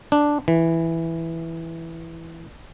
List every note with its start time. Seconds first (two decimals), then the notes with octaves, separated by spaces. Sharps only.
0.12 D4
0.48 E3